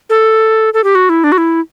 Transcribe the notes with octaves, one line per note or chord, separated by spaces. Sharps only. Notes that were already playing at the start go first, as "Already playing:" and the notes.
A4
A4
G4
F#4
E4
D4
F#4
E4